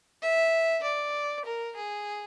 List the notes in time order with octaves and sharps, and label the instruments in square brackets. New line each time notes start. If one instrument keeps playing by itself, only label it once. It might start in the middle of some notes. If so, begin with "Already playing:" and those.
[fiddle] E5
D5
A#4
G#4